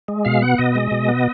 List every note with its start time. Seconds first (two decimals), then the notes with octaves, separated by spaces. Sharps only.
0.08 G#3
0.25 B2 F5
0.42 B3 F#5
0.58 B2 D#5
0.75 G#3
0.91 B2
1.08 B3